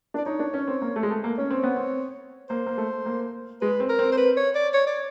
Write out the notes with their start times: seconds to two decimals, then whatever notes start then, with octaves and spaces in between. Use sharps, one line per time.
0.14 D4 D5
0.25 D#4 C#5
0.39 D4
0.54 C#4
0.68 C4
0.82 A#3
0.96 A3
1.03 G#3
1.10 A3
1.24 A#3
1.38 C#4 C#5
1.51 C4
1.63 B3
1.76 C4
2.49 A#3 C5
2.66 A#3
2.78 A3
3.06 A#3
3.61 G#3 B4
3.80 C4
3.89 A#4
3.99 C4
4.12 C5
4.17 B4
4.37 C#5
4.55 D5
4.74 C#5
4.87 D5